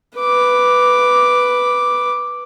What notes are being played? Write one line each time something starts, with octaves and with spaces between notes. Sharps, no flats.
B4 D6